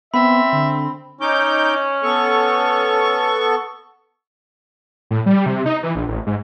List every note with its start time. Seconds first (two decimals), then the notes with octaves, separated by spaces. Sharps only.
0.14 B3 C4 E5 B5
0.53 D3
1.21 C#4 D#4 D6 G6
2.03 B3 A4 C#6
5.11 A2
5.26 G3
5.46 C3
5.66 D#4
5.83 E3
5.95 A#1
6.08 A1
6.26 G#2